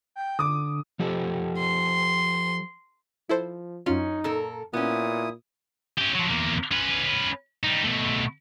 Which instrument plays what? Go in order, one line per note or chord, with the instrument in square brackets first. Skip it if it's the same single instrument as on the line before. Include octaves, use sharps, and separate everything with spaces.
[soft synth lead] G5
[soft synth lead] D3 [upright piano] D6 D#6
[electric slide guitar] F3 G4 A4
[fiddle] C6
[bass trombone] F3 [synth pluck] E4 A4 C5
[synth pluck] F#2 F4 [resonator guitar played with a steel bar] C#4 [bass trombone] D#4
[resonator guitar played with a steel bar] A#2 A4 A#4
[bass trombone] A#2 [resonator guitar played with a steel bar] B3 C#4 [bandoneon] E4 D#6
[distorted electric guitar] C#4 G4
F3 F#3
E2 A#3
C#4 B4
G3 D#4
B2 A3